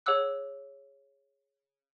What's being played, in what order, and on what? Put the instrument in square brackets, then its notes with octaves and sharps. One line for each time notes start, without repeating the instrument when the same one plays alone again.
[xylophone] G#4 C#5 F#5 D6 E6 F#6